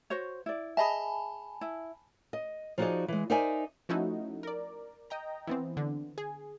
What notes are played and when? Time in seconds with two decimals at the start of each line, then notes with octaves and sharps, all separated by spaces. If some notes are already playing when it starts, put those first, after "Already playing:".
0.10 F#4 C5 C#5
0.46 E4 D5
0.77 G#4 D#5 E5 G#5 A5 B5
1.61 E4
2.33 D#5
2.78 F3 D#4 F#4 G#4 D5 D#5
3.08 E3 G#3
3.30 D#4 A#4 C5 D5 E5 G#5
3.89 F3 A3 C#4 D#4 E4 F#4
4.43 A#4 D5
5.10 D#5 G5 A#5
5.47 E3 B3 C4
5.77 D3
6.18 G#4